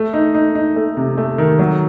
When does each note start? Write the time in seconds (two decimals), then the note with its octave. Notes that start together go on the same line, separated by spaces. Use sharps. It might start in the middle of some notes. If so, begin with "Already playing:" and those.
Already playing: A3
0.13 D#4
0.34 D#4
0.55 D#4
0.76 A3
0.97 C3
1.17 A3
1.38 D#3
1.59 F#3